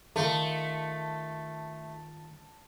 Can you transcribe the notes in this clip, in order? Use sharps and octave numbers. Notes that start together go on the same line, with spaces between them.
D#3 A3 D#4 F4